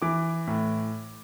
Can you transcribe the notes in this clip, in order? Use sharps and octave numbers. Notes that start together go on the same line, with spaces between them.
E3 D6
A2